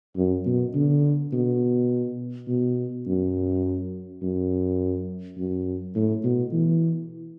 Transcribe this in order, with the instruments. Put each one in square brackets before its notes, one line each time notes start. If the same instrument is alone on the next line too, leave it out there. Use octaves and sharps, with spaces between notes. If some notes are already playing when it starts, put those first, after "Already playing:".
[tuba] F#2
B2
D3
B2
B2
F#2
F#2
F#2
A2
B2
E3